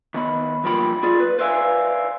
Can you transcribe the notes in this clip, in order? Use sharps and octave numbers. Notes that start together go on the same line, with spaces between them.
D#3 B3 B5
B1 G2 F3 A#3 G4 B5
F4 G#4 D5
B4
B4 C5 D5 E5 F5 G#5